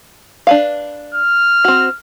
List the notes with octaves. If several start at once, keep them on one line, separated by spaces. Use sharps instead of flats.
D4 B4 F5
F6
C4 F#4